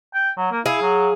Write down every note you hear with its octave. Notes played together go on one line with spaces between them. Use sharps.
G5
F#3
A#3
E4 G#4 F5
F#3